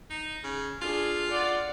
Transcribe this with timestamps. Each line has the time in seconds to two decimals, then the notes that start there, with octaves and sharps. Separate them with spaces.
0.10 D#4
0.44 C#3
0.82 D4 F4 G#4
1.30 D5 F#5